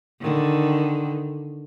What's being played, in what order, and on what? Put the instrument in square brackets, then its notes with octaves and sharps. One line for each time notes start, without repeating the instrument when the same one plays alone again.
[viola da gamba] D3 D#3